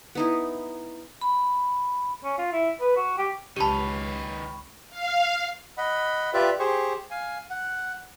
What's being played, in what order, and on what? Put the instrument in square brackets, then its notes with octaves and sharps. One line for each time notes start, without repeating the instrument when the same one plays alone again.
[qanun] B3 D#4 E4
[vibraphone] B5
[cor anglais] C#4
F4
E4
B4
F#4
G4
[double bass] C#2 [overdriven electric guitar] D#3 B4 [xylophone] G4 A5 [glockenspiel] B5 C#6
[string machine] F5
[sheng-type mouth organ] D#5 F#5 B5
F4 G4 B4 D5 E5
G4 G#4 C5 C#6
F5 G#5
F#5